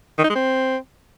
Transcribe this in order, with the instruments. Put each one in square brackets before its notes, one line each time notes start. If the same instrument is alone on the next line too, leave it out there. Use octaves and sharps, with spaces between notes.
[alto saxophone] D#3
D#4
G#3
C4